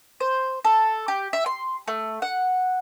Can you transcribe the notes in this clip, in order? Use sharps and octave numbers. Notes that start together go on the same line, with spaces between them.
C5
A4
G4
E5
C6
A3
F#5